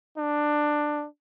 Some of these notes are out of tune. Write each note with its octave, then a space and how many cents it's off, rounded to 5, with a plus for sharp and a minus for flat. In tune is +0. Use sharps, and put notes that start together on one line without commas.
D4 +15